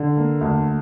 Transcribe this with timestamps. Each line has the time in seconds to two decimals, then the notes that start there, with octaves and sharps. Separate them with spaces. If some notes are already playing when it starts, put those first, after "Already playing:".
Already playing: D3
0.17 A#3
0.41 D2